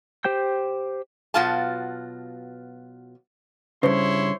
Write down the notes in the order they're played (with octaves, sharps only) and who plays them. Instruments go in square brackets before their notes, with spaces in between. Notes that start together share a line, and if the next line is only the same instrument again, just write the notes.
[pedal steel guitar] G4 C5 G5 G6
[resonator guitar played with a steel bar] B2 F#3 B3 F4 F5 A5
[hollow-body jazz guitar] G2 C#3 [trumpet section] E4 C#5 C6 [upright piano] C5